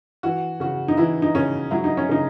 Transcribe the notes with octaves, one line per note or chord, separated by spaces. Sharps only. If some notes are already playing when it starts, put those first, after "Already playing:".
E3 F#4
C#3 F#4
D#4
E3 E4
D#4
C#3 C#4
F#3 E4
D#4
C#4
C#3 D#4